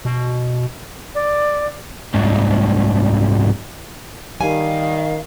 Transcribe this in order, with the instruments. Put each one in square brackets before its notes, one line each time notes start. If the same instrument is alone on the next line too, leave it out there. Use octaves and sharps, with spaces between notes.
[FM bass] B2
[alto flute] D5
[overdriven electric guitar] C2 G#2
[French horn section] D#3 [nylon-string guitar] G3 G#5 [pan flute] F5